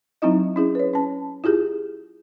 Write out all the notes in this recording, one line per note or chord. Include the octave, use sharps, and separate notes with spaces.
F#3 C4 D#4 E4 D#5
C#4 E4 G#4
B4 C#5
C#4 A5
E4 F4 G4 G#4